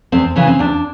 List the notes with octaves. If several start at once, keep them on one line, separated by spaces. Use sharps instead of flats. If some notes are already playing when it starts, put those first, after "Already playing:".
E2 C4
C#3 E3 C#4
C4
E2 D4